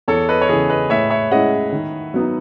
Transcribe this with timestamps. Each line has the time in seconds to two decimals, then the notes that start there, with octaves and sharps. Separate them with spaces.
0.08 E2 A4 C#5
0.29 B4 D#5
0.41 C#5
0.49 C#3 E3 G#4 B4
0.70 B4 D#5
0.90 A2 C#5 E5
1.10 C#5 E5
1.31 G#3 C#4 E4 D#5 F#5
1.72 D#3
2.14 F#3 B3 D#4